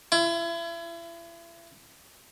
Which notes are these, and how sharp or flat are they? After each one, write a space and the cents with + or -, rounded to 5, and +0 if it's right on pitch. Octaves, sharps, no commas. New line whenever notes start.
E4 +35